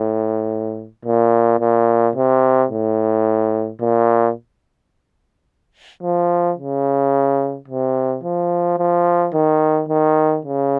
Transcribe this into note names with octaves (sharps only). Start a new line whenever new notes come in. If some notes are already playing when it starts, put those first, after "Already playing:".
Already playing: A2
A#2
A#2
C3
A2
A#2
F3
C#3
C3
F3
F3
D#3
D#3
C#3